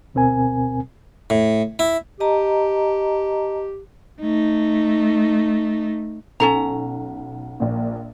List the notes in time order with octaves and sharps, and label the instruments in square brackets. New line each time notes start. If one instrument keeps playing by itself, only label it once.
[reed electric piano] D2 B2 C4 A#4 G#5
[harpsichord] A2
E4
[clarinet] G4 [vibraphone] D#5 A5 A#5
[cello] A3 D#4
[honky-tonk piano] B1 [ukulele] C#4 A4 A#5
[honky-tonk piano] A#1 A#2